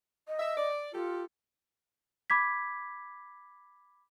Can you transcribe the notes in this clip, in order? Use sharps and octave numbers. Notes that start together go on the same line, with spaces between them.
D#5
E5
D5
F4 G4 A4
B5 D6 G#6 B6